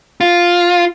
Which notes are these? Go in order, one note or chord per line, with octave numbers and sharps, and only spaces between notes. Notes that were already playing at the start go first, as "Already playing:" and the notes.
F4